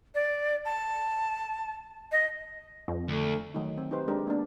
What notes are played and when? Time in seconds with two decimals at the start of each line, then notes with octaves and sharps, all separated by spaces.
0.14 D5
0.65 A5
2.11 D#5
2.88 F2
3.08 D2 A3
3.54 D#3 F#3 A3 D#4
3.78 C4
3.91 D#4 G4 B4 C5
4.08 G#3 D4 G4 A#4
4.27 A#3 B3 D4